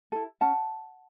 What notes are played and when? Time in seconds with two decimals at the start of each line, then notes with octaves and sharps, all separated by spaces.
0.12 E4 A4
0.41 C#4 F#5 A5